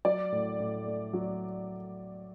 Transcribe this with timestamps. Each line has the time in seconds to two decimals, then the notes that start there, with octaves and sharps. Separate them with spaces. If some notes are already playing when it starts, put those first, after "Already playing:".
0.05 F#3 D5
0.32 A2
0.60 A2
0.86 A3
1.13 F#3